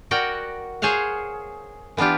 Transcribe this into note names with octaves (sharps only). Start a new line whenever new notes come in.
F#4 A#4 D5 F#5 G5
G#4 C5 C#5 F5 F#5
E3 B3 D4 F4 G4